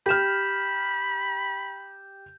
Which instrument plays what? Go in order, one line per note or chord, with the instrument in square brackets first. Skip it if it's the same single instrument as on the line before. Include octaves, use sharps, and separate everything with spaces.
[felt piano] G4 F6 [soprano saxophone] B5 [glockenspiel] G6 E7